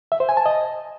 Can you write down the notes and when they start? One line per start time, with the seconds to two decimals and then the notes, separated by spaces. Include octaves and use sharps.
0.12 E5
0.20 C5
0.29 G#5
0.37 A5
0.46 D#5